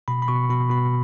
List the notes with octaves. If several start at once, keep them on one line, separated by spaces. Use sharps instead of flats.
B2 B5
B5
B2 C#6
B2 B5
B2 B5